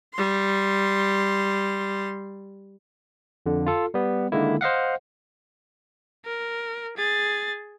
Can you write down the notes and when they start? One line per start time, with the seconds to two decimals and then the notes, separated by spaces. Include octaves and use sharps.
0.13 G3 C6
3.46 F2 D3
3.66 F4 A4
3.94 G3 B3
4.32 D3 D#3 G#3 A#3 E4
4.61 C5 D#5 F5 F#5
6.25 A#4
6.97 G#4 A6